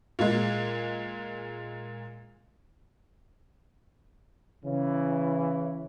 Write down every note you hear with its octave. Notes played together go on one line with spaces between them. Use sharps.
A#2 G#3
C#3 E3